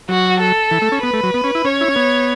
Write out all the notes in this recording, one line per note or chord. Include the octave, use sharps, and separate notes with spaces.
F#3 F#4
A4
E3
A3
C#4
B3 B4
A3
F#3
B3
C#4
E4
C#4 C#5
E4
C#4
B3